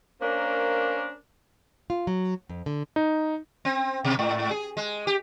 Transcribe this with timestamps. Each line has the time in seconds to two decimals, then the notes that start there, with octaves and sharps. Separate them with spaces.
0.21 A#3 C#4 D4 A#4 C5
1.90 F4
2.07 F#3
2.49 F2
2.66 D3
2.96 D#4
3.65 C4
4.04 B2
4.19 G#2
4.51 G#4
4.77 G#3
5.07 G4